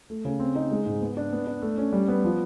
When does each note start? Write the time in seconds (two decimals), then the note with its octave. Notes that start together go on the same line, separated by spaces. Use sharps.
0.10 A3
0.25 C#3
0.40 C4
0.56 D#4
0.71 G#3
0.86 G#2
1.02 B3
1.17 D4
1.33 B3
1.47 D4
1.62 A3
1.78 C#4
1.93 G3
2.08 B3
2.24 F3